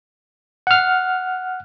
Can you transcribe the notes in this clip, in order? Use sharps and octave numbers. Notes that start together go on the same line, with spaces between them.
F#5 F6